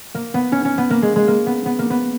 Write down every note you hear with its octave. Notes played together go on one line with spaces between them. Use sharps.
A#3
B3
C#4
C#4
B3
A#3
G#3
G#3
A#3
B3
B3
A#3
B3